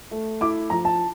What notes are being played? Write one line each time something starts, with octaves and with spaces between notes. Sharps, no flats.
A3
E4 D6
F3 A#5
A5